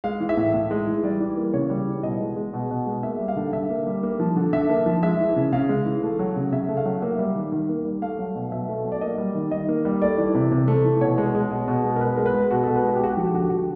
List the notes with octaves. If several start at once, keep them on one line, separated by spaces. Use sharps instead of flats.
G#3 F5
E3
E5
A2
A2
G#3
E3
G3 D5
E3
A#3
C#3 C#5
G3
E3
B2 D#5
G#3
G#3
B2
B2
G#3
A#3 E5
G3
F5
D3
D3 E5
A#3
G3
A#3
F3
D3
D3 E5
A#3
F3
G#3 E5
E3
C#3
C#3 F5
G#3
E3
A3
F#3
C#3
C#3 E5
A3
F5
F#3
A#3 E5
G3
D#3
D#3
A#3
G3
A3 F5
F#3
B2
B2 E5
A3
F#3
D5
A#3 D#5
G3
D#3
D#3 D#5
A#3
G3
A3 D5
E3
C3
C3
A3
E3
B2 C#5
G#3
G#3
B2
B2
G#3
A#4
B2 B4
G#3 A#4
B4
G#3
B2 F#4
A4
B2
B4
G#3 F#4
G4
G#3 F#4
G4
F3 F#4
G4
D3 F#4
G4
D3 F#4